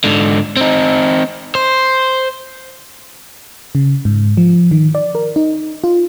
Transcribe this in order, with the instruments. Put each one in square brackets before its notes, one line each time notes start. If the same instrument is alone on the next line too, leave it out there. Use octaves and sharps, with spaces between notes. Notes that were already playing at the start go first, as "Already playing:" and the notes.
[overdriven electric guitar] G#2 D3
C4 D#4
C5
[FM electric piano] C#3
G#2
F3
D#3
D5
A#4
D#4
F4